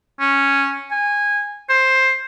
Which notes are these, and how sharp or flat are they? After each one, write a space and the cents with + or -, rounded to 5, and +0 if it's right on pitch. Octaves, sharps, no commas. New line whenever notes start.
C#4 -5
G#5 -15
C5 +10